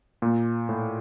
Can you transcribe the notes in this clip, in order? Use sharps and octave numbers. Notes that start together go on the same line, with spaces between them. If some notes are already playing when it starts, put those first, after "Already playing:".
A#2
A2